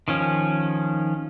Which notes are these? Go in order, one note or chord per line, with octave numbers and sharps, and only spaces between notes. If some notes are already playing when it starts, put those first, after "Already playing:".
D#3 F3 C#4